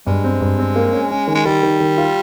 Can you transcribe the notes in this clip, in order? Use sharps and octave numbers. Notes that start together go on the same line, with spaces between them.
G2 G#3
C4
G2
C4
A#3
C#4
C#4
D#3
G#3
D#3 G3
D#3
D#3
F4